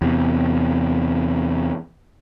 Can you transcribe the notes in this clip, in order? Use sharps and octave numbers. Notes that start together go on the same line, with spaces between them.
E2 C3